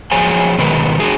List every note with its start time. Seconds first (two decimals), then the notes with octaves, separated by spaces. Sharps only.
0.11 F3 F#3 G#4 C5 C#5 G#5
0.58 B2 D#3 G#3 A#4 B4
1.00 D4 F#4 G#4